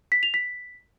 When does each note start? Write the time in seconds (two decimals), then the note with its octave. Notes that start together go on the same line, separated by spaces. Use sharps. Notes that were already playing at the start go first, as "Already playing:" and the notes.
0.12 B6
0.23 F7
0.34 B6